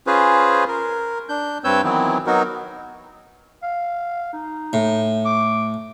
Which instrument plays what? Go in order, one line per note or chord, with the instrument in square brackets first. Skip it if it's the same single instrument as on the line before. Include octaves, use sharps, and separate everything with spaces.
[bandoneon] C#4 F4 G#4 B4 C5
A#4
D4 G6
G2 C4 B4 C#5 E6 G6
D#3 E3 F#3 B3 C4 E4
F#3 B3 D#4 F#4 A#4
[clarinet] F5
D#4
[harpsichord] A2
[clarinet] D6